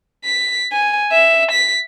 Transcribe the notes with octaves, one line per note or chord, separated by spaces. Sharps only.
B6
G#5
E5
B6